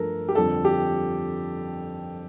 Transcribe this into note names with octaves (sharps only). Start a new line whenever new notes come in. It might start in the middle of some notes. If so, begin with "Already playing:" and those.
Already playing: G2 F3 A3 A4 A#4
G4
F2 D3 G3 A4
G4